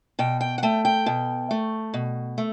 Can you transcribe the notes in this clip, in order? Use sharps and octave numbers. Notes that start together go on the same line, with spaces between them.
B2 G5
G5
F#5
A3 G5
G5
B2
A3
B2
A3